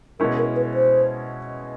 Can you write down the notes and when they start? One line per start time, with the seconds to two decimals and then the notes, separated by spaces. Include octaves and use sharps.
0.19 B2 G#3 C#4 E4 A#4
0.38 A#4
0.56 B4
0.74 C5